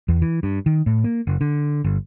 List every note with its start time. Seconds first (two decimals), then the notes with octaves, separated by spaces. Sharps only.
0.08 E2
0.22 E3
0.43 G2
0.66 D#3
0.86 A2
1.04 A#3
1.27 F#1
1.41 D3
1.84 G1